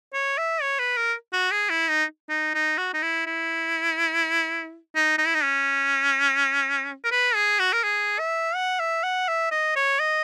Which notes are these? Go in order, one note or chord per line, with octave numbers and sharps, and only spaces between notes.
C#5
E5
C#5
B4
A#4
F#4
G#4
E4
D#4
D#4
D#4
F#4
D#4
E4
E4
D#4
D#4
E4
D#4
C#4
A#4
B4
G#4
F#4
A#4
G#4
E5
F#5
E5
F#5
E5
D#5
C#5
D#5